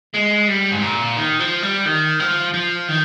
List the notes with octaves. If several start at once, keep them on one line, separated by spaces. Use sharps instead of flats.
G#3
G3
G#2
A#2
D#3
F3
G3
D#3
F3
F3
D#3